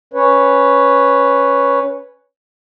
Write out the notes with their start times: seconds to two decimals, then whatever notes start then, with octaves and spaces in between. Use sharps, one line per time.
0.14 C#4 B4 C#5